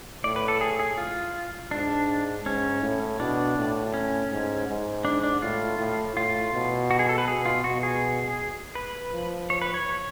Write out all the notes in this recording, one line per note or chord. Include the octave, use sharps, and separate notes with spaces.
A2 D5
B4
A4
G#4
G#4
F4
G#2 D4
G#2 C#4
A2
B2 D4
A2
C#4
G#2
G#2
D4
D4
A2 F4
A2
A2 F4
B2
F#4
G#4
A4
B4
B2 G#4
F4
B2 F#4
G#4
B4
F3
C#5
B4
C#5